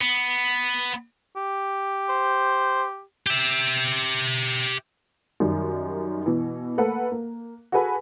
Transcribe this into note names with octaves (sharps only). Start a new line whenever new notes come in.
B3
G4
C5
G4 E5
F#2 D#3 G3
B2 E3
A3 A#3 A4 B4 F#5
A#3
F#4 G#4 A4 B4 G#5 B5